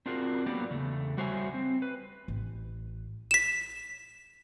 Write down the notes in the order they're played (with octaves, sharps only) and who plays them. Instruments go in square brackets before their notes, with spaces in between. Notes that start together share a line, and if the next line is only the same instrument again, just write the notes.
[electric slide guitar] C4 D4 F4 F#4 G#4 A#4
F#3 A#3 B3 G4 D5
E2 C#3 A3
G3 F#4 C5 C#5 E5 G#5
C4
B4
[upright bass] A1
[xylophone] B6 E7